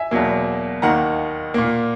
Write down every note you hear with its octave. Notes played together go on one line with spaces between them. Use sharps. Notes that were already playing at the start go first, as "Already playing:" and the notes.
Already playing: E5 G#5
E2 B2 F#3 A#3
D#2 D#3 A#3 F#5 A#5
A#2 A#3